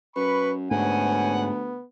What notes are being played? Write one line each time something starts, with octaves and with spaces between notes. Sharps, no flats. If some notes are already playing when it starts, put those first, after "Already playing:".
F#2 B4 B5 C#6
D2 G#2 B3 C#4 F#5 G#5